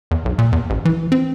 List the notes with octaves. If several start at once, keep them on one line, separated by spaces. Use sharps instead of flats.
E2
B1
A#2
E2
A1
E3
C4